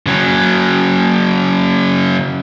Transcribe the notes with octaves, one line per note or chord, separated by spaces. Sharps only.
C#3 F#3